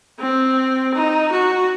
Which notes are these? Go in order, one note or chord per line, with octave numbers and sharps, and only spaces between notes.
C4
D#4
F#4